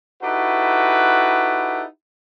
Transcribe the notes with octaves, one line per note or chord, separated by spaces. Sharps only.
D#4 E4 F#4 G4 A4 B4